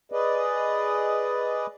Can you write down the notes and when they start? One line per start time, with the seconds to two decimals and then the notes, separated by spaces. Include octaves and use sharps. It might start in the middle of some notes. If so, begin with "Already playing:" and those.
0.12 G#4 B4 D5 D#5